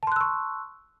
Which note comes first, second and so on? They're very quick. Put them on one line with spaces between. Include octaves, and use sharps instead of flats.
A5 C6 F#6 E6 C#6